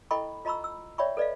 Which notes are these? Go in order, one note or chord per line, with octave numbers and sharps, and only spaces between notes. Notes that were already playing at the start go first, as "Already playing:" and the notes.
E4 A4 D#5 G5 B5 C#6
F4 D#5 A#5 B5 C#6 E6
E6
C#5 D5 E5 G5 B5 C#6
A4 B4 D5 D#5 F5